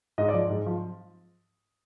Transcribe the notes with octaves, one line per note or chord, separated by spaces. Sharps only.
G#2 D#5
D5
F3
G#2
F3